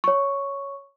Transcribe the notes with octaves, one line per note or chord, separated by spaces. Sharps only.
C#5 C#6